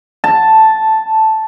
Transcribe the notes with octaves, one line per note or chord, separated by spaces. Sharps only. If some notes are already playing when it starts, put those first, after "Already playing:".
A5